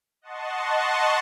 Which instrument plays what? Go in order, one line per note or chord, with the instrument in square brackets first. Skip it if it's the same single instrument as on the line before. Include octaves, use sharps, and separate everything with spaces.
[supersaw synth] D#5 F#5 A5 C6 C#6